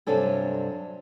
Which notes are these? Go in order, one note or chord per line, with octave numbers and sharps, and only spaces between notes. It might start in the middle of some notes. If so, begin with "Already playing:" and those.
G2 C3 F#3 D4 A4 G#5